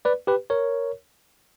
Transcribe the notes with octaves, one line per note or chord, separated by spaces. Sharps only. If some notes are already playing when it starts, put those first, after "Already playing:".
B4 D5
G4 B4
A#4 C#5